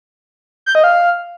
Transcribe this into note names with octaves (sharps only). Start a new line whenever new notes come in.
G6
D#5
F5